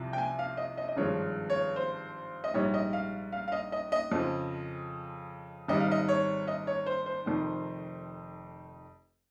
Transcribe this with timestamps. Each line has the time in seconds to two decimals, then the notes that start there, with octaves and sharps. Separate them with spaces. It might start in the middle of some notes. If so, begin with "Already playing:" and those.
Already playing: C2 C3 F3
0.13 G5
0.18 G#5
0.39 F5
0.57 D#5
0.77 D#5
0.88 D#5
0.97 G#1 G2 F3 G#3 C#5
1.50 C#5
1.76 C5
2.44 D#5
2.54 A#1 G#2 G3 C#5
2.74 D#5
2.93 F5
3.32 F5
3.48 F5
3.52 D#5
3.72 D#5
3.92 D#5
4.12 F2 C#3 F3
5.68 G#1 G#2 G3 D#5
5.80 F5
5.91 D#5
6.09 C#5
6.48 D#5
6.67 C#5
6.86 C5
7.06 C5
7.26 F1 F2 D#3